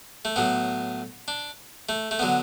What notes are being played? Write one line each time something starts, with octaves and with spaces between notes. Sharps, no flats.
A3
A2 F#3 B3
D4
A3
A3
D3 F#3 B3